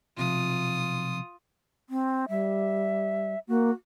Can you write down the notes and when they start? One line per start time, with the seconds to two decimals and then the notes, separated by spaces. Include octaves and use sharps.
0.17 B1 C3 F3 F4 D#6
1.89 C4
2.29 G3 E5
3.48 A#3 F#4